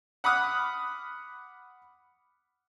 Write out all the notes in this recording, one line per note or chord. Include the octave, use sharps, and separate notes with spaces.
F#5 B5 D6 D#6 F6 F#6